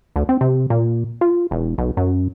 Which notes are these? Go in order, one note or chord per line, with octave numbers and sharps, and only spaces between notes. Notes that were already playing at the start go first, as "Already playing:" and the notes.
D2
C4
C3
A#2
F4
E1
B1
F#2